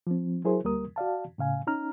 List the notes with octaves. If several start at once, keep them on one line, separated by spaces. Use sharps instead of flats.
F3 C4
F#3 E4 G#4 A#4 C5
D2 G3 A#3 A#4 D#6
F#4 D5 F5 A5
A2 C#3 F5 G#5
C#4 D#4 A#5 F6